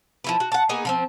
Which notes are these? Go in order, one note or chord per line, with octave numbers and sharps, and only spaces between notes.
F3 E4 B4
F#4
F#5 A5
A#3 B3 D#4 G#4
D3 F3 C4